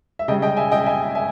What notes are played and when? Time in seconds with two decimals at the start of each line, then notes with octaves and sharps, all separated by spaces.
0.19 E5
0.28 C#3 G3 D#5 G5
0.42 D#5 G5
0.57 E5 G#5
0.72 D#5 G5
0.86 E5 G#5
1.15 E5 G#5